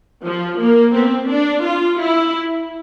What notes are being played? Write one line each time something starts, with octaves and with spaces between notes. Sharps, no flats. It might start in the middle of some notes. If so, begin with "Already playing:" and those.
F3
A#3
C4
D4
F4
E4